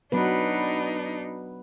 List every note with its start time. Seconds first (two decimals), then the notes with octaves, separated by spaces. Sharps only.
0.12 F#3 B3 D4 D#4 B4